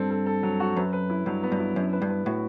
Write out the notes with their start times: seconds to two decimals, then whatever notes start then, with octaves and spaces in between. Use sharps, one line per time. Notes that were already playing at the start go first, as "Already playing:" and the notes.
Already playing: G2 C4 A4
0.10 A4
0.26 A4
0.43 F#3
0.60 F#4
0.77 F#2 B4
0.93 B4
1.10 E4
1.26 G2 F#3
1.43 B3
1.52 G2
1.59 E4
1.76 F#2 D4
1.93 B4
2.02 G2
2.10 B4
2.26 A2 F#4